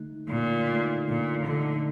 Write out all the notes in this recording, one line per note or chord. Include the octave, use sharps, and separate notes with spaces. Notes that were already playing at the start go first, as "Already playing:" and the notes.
Already playing: D3 A3 D#4
A#2 D3
A3 D#4
A#2 D3
D3 A3 D#4